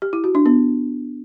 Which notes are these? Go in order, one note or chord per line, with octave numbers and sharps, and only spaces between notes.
G4
E4
F#4
D4
B3